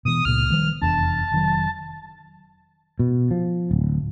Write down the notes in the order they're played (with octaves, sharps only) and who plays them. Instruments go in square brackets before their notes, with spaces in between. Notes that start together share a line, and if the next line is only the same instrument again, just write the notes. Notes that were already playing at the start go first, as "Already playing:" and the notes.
[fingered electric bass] B2 E3 [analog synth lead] D#6
[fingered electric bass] C#2 A#2 [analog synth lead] F6
[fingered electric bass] D#3 F3 G3
[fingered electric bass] F1 E2 D4 [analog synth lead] A5
[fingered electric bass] F1 D#3 F#3
[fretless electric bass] B2
F3
D1